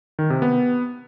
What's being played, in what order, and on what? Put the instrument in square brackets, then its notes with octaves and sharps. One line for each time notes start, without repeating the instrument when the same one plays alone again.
[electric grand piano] D#3
C3
B3